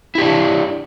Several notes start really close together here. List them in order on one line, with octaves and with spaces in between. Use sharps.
E4 G4 D4